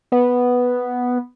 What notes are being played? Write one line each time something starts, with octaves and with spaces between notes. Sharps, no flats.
B3